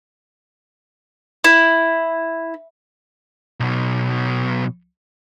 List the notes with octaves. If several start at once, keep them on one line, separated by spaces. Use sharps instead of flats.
E4
B1 B2